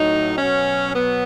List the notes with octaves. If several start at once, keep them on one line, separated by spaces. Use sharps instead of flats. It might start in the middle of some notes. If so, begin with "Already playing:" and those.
Already playing: A2 F#3 D#4
B2 F#3 C#4
B3